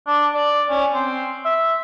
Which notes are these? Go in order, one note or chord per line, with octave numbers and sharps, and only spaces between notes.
D4
D5
C#4
C4
E5